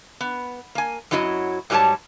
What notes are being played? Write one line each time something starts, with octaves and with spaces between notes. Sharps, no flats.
B3
A#3 G#5
F#2 F#3 E4 F#4 D#5
G#2 F#3 G3 G#4 C#5 A5